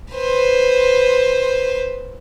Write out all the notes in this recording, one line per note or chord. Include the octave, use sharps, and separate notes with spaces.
B4 C5